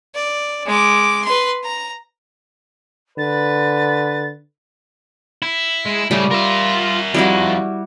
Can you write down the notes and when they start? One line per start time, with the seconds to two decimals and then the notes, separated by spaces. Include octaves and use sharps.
0.15 D5
0.66 G#3 D6
1.25 B4 C6
1.64 A#5
3.18 D3 B4 A6
5.42 E4
5.86 G#3
6.11 C#3 G3 A3 E4
6.31 F4 A#4 E5
7.14 F2 G3 E4 F#4